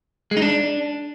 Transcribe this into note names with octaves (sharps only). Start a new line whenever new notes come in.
G#3
D#4
D4